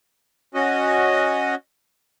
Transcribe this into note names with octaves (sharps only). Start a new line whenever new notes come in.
C#4 F#4 D#5